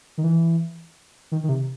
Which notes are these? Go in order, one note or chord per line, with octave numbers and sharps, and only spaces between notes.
D#3
E3
D#3
D#3
C3